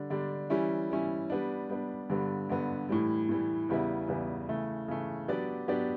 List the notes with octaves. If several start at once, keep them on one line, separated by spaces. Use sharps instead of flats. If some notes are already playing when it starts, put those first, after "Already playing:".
Already playing: D3 G3 D4
D3 G3 D4
E3 G3 C#4 E4
E3 G3 C#4 E4
G3 B3 D4
G3 B3 D4
G2 D3 G3 B3
G2 D3 G3 B3
A2 E3 G3
A2 E3 G3
E2 C#3 G3 B3 E4
E2 C#3 G3 B3 E4
C#3 E3 A3
C#3 E3 A3
F#3 B3 D4 G4 D5
F#3 B3 D4 G4 D5